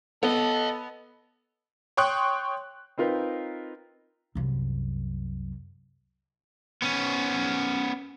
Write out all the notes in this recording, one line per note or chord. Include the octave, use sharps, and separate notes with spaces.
B3 A4 C#5 D#5
C#5 G5 C6 C#6 D#6 F#6
C4 D#4 F4 A#4 B4
C2 F#2
B3 C#4